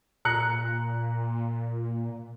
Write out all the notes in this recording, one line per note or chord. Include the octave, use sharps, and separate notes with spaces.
A#2 A#5 F#6 C#7